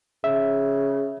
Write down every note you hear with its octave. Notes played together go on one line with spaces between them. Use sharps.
C#3 E5